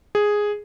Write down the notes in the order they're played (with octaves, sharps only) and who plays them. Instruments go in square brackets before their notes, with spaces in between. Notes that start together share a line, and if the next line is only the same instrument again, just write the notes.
[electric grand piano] G#4